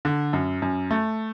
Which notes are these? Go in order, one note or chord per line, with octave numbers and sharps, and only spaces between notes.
D3
F#2
F#2
A3